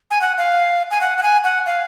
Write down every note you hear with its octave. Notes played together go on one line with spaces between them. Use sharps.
G#5
F#5
F5
G#5
F#5
F#5
G#5
F#5
F5